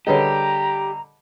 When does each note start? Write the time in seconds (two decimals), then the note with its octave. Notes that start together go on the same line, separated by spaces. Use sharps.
0.07 D3 G3 G4 G#4 B4 C#5 D#5 A#5